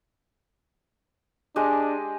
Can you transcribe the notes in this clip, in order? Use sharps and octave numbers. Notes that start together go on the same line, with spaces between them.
G#3 D4 G4 D#5